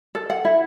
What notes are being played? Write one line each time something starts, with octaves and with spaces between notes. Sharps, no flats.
A4
F#5
E4